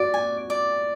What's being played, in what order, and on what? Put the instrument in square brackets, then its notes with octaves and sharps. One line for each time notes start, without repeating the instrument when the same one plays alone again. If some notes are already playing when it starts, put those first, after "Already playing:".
Already playing: [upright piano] F#4 [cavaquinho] D5
[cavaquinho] G#5
D5